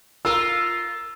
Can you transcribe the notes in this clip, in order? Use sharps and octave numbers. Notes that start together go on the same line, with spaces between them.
F4 A#4 E6